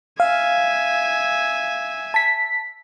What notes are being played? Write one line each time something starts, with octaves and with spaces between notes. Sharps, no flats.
E5 F5 G#5
A5 B6